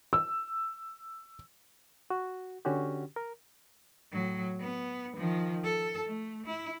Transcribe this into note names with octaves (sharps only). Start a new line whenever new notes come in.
E6
F#4
D3 C#4 F#4 G4
A#4
A2 F#3
B3
D#3 F3
A4
A3
E4